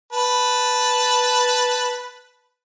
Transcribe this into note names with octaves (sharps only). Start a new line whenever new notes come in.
B4 A5